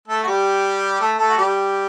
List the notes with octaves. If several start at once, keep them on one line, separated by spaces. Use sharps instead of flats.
A3 A4
F#4
G3 G4
A3 A4
A3 A4
F#4
G3 G4